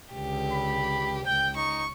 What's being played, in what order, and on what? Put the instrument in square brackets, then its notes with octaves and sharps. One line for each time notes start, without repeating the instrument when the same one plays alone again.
[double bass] C#2 D3 [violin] G4
[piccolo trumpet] B5
[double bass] C#2 [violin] G5 [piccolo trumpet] G6
[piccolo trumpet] D#4 [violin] C#6